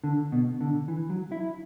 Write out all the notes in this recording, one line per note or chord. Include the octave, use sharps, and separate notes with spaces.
D3
B2
D3
E3
F#3
E4